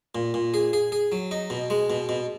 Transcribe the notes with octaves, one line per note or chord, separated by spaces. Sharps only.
A#2
A#2
G#4
G#4
G#4
F#3
D#4
B2
G#3
B2
B2